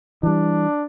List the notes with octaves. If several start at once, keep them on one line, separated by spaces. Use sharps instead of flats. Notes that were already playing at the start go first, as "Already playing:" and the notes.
E3 G3 D4